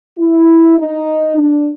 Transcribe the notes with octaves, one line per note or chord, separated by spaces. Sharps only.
E4
D#4
D4